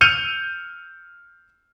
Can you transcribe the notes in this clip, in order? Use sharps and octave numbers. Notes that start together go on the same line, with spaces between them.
E6 F6 G6 C#7 D#7 F7